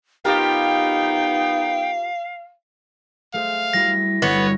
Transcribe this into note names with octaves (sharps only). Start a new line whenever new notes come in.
B3 D#4 F4 G4 A#4 F5 G5
A3 G#4 C5 F5
G3 E4 F#4 A#6
G1 G3 B3 C#5 E6